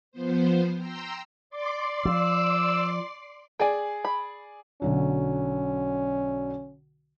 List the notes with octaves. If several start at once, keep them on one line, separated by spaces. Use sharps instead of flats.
F3 B3 C5
G5 A#5 C6 E6
D5 C6 D6
F3 E6
G#4 D5 G5 G#5
B5
B1 D3 F#3 C#4